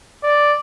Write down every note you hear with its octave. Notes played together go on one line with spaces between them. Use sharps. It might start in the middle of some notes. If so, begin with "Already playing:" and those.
D5